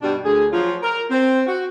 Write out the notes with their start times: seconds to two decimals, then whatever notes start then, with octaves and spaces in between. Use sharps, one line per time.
0.02 G2 B2 G3 D4
0.24 D2 G#4
0.52 F3 F#3 F4
0.82 A#4
1.10 C4
1.47 F#4